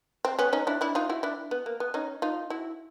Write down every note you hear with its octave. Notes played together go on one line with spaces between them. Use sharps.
C4
B3 C#4
C#4 D#4
D4 E4
D4 E4
D#4 F4
E4 F#4
D4 E4
B3
A#3
B3
C#4 D#4
D#4 F4
E4 F#4